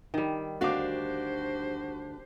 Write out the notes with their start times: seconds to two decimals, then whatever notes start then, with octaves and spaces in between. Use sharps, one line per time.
0.14 D#3 G3
0.61 D2 D4 F#4 G4 C5 F5 D6